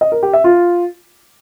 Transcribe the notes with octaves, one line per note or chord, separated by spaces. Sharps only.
D#5
A#4
G4
E5
F4